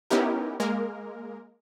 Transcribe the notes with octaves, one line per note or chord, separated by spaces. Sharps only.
B3 C#4 D#4 E4 G4 A#4
G#3 A#3 A#4